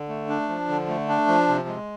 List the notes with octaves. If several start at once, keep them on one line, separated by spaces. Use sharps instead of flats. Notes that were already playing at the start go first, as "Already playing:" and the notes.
Already playing: D3
A3
D4
F3
D3
A3
D4
F3
C3
G#3